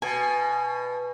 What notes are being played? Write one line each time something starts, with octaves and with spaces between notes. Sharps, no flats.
B2 G#5